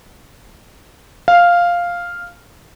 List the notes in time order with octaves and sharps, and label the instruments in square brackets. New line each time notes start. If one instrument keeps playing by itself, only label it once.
[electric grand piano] F5